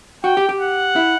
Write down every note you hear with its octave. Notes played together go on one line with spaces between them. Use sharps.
F#4 G5
G4
G4
F#5
E4